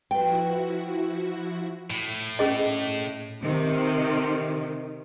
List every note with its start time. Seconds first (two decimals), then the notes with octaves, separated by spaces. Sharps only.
0.11 F3 E4 F#4 B4 G5
1.90 A2
2.39 C#4 G#4 D#5
3.43 C3 D#3